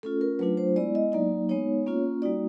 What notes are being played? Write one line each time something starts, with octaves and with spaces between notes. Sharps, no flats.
A3 C#4 F4 A4
A#4
F#3 A3 D4 F4 B4
C5
G#3 B3 E4 D5
D#5
F#3 A#3 D#4 D5
G#3 B3 D#4 C#5
A#3 C#4 F4
G3 A#3 D#4 F#4 D5